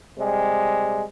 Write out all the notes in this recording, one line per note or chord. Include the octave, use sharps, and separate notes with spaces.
C3 G3 G#3